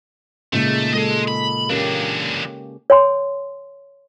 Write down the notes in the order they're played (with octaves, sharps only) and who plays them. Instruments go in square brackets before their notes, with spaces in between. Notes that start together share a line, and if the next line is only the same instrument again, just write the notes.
[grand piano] A#2 [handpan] C#3 G#3 D#4 [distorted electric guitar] A3
[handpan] G#3 A4 [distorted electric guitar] D#5 C6
[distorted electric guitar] B5
[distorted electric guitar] E3 D4 [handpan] A#3 C#4 G4
[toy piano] C#5 G#5 C6